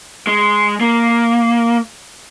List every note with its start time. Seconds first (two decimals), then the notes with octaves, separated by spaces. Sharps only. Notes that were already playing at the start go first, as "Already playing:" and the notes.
0.27 G#3
0.81 A#3